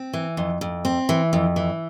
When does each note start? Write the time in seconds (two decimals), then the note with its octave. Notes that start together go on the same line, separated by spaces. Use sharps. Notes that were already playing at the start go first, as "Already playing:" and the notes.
Already playing: C4
0.13 E3
0.37 F2
0.61 F2
0.85 C4
1.09 E3
1.33 F2
1.56 E3